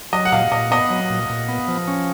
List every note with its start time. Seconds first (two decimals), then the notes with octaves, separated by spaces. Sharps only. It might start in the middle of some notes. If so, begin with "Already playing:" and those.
0.13 F#3 D#5
0.25 F#5
0.32 A#2 F5
0.52 A#2 D#5
0.71 B3 D#5
0.90 F#3
1.10 A#2
1.30 A#2
1.48 B3
1.68 F3
1.88 C#4